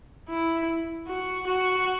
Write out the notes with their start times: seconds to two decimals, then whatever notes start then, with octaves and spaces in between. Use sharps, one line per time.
0.29 E4
1.08 F#4
1.46 F#4